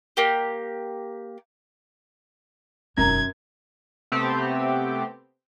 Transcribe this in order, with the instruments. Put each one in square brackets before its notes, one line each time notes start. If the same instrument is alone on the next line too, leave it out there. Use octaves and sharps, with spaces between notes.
[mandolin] A#3 G4
[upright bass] E1 D#4 [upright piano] F#2 [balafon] C#4 A#4 A#5 [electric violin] G#6
[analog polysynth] C3 A3 B3 C4 G4